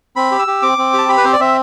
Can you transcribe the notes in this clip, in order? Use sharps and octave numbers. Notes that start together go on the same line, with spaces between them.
C4 B5
G4
E6
G4
C4 D6
C4
G4 A5
G4 B5
B4
C4 C5
D5
C4 E5